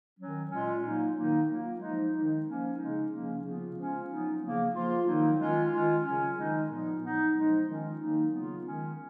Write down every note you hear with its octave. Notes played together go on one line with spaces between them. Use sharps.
D#3 F#3 C#4
A#2 G#3 C#4 F4
F#3 A#3 D#4
D#3 A#3 D#4
F#3 A#3 F4
F3 G#3 D#4
D#3 G#3 D#4
F3 A#3 C#4
C#3 G#3 D#4
C#3 F3 A#3 C#4
C#3 F3 B3 F4
F3 G#3 C#4 F4
F#3 B3 D#4
C#3 F3 A#3
F3 A#3 F4
D#3 F#3 A#3 D#4
D#3 G#3 C#4 F4
D#3 G#3 C#4 F4
C#3 F#3 C#4
D#3 G#3 D#4
A#2 F3 B3 D#4
F#3 B3 D#4
F3 G#3 D#4
D#3 G#3 C#4 F4
D#3 F#3 A#3 D#4
C#3 F#3 B3 F4
D#3 G#3 C#4 F4